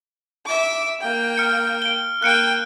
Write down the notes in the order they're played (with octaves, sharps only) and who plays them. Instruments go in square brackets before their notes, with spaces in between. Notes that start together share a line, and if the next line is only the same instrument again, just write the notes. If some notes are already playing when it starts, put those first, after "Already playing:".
[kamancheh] E5 D6
A#3 G5
[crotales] F6 C#7
D7 G7
[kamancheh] A#3 G5 [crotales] F#6 C#7 D7